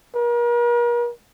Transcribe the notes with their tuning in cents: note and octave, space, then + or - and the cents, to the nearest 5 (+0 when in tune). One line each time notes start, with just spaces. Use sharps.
A#4 +40